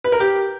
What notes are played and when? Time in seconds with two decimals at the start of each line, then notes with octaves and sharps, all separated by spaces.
0.04 B4
0.12 A#4
0.20 G4